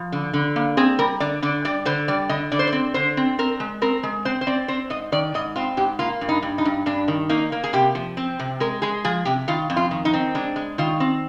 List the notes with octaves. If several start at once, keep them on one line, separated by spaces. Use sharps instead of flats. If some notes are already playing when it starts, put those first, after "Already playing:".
Already playing: F3
D3
D3
A#3
C4 G#4
G3 A#4
D3 D5
D3 D5
G3 D5
D3 C5
G3 D5
D3 D#5
D3 D5
C5
D5
C4
D3 C5
C4
C4 A#4
G#3
C4 A#4
G#3
C4 C5
C5
C4 D5
C4 C5
G#2 D#5
D#3 D5
G#2 D#5
C4 F4
G#2 G4
A#3 F4
G2
D#4
G2
D#4
G2
G2 D4
D#3
A#3 D#4
A#3
G#4
C3 G4
F3
C4
C3
G#3 A#4
G#3 G#4
F3 G#4
C3 G4
D#3 F4
F2
F4
D#3
D#4
C4
G#3 D4
G#3
D#3 F4
C4